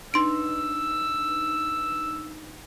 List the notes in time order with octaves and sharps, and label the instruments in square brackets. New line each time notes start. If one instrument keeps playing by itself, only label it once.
[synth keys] D4 D#4 B4 [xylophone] C6 D7 [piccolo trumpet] E6